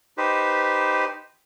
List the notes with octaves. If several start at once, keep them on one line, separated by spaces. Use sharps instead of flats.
D#4 G4 B4 C5